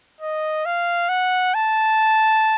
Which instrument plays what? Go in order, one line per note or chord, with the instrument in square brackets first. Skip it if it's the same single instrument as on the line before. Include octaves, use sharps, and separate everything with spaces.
[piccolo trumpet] D#5
F5
F#5
A5